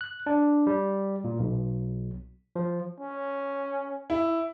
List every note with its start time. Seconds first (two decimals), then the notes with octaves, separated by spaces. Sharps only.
0.01 F#6
0.26 D4
0.67 G3
1.24 A#2
1.39 B1
2.56 F3
3.00 C#4
4.10 E4